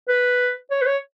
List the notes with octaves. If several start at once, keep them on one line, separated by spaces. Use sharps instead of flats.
B4
C#5
B4
C#5